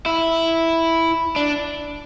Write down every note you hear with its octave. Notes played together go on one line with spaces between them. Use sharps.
E4
D4